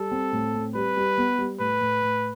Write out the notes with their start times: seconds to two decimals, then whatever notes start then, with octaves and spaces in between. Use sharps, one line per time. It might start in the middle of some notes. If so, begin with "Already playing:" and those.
Already playing: G3 A4
0.11 C4
0.32 A2
0.54 C4
0.75 G3 B4
0.97 G3
1.18 B3
1.38 G3
1.59 A2 B4
1.81 A2
2.03 A2